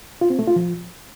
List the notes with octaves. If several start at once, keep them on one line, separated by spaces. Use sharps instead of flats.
F4
C4
A3
F4
F3